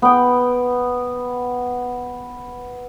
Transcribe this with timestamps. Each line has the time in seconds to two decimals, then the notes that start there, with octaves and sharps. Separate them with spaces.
0.02 B3 G5